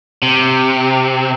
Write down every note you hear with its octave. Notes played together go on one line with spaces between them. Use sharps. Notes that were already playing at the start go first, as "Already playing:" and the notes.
C3